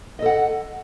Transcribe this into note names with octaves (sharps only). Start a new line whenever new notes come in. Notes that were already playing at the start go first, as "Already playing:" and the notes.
A4 D#5 F#5